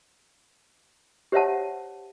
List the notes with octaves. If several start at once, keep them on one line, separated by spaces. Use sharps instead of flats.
G4 C5 C#5 E5 F#5 A5